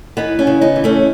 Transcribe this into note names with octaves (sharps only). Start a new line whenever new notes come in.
E3 B3 D#4
C#4 E4
C#3
B3 D#4
E3
A3 C#4